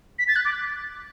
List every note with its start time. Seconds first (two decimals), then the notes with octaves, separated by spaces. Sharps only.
0.19 B6
0.28 A6
0.36 F#6
0.45 D6